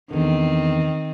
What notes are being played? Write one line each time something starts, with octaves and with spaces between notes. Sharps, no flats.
E2 D3 D#3 C4